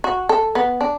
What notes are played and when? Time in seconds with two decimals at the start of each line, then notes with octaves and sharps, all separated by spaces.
0.04 F#4
0.29 A4
0.55 B3
0.81 D4